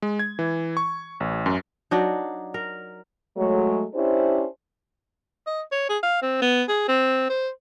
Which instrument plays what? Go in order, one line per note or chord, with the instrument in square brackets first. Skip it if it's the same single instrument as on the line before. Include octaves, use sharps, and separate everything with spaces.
[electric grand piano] G#3
G#6
E3
C#6
A1
F#2
[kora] F#3 D4 D#4
A#4
[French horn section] F#3 G#3 A3
C#4 D4 E4 G4 C5
[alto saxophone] D#5
C#5
G#4
F5
C4
B3
G#4
C4
C5